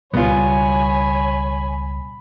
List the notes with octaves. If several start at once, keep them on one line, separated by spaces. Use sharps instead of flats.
C#2 B2 G3 B3 F4 C#5 G#5 B5